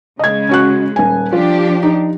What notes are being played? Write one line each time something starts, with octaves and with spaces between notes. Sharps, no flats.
C#3 G#3 D#5 G#6
C#4 F#4 F#6
D#1 G#5
F3 D4 F4 G4
D#4